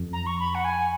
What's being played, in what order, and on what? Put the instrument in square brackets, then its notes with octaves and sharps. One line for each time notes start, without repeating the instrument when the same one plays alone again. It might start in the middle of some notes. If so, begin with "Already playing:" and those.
Already playing: [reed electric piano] F2
[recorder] A#5
C#6
B5
F#5
G#5